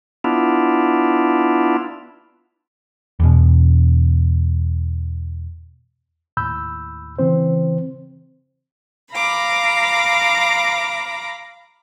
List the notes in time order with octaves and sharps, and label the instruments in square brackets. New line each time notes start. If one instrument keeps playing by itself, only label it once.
[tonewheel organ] B3 D4 E4 F4
[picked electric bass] E2 B2
[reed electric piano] D#2 A2 B5 E6 G6
C#3 E3 C4 C5
[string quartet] F5 A#5 B5 D6